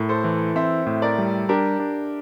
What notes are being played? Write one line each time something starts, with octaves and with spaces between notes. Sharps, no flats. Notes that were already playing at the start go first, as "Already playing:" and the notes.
Already playing: A2 A#4
A4 C5
E3
C4 C5 E5
A2
A#4 D5
G3
D4 G4 A#4
D4